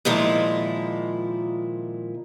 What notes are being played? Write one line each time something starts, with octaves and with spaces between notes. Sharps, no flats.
A#2 D#3 F3 G#3 E4